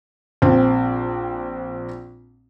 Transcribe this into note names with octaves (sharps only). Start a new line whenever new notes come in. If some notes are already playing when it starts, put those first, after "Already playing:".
A#1 C4